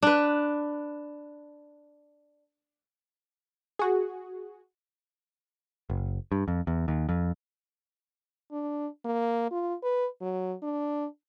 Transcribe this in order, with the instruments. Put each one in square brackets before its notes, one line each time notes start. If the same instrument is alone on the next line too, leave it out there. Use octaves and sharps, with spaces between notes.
[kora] D4 B4
[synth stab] F#4 G#4
[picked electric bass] F#1
G2
F2
E2
D#2
F2
[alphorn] D4
A#3
F4
B4
F#3
D4